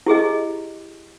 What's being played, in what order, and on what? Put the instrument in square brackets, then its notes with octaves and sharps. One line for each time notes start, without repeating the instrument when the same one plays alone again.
[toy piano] E4 G4 G#4 D#5